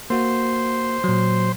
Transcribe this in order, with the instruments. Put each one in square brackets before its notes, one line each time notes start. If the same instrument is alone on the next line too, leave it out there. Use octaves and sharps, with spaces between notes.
[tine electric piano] A#3 F#4 [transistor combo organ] C5
[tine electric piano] A#2 F#3